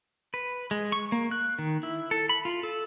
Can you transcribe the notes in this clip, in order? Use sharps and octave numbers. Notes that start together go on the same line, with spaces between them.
B4
G#3
C#6
A#3
F#6
D#3
E4
A4
B5
F4
A4